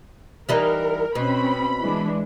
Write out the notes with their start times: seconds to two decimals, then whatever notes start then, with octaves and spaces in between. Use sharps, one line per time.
0.49 E3 G3 D#4 A#4
1.15 B2 C4 C#4 B5
1.80 E3 G#3 D4